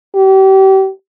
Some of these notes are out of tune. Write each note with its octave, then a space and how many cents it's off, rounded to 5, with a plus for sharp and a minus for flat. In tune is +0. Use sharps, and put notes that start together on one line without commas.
G4 -35